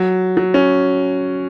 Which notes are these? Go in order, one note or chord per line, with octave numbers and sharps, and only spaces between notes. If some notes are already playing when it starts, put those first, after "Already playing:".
Already playing: F#3
F#3
C#4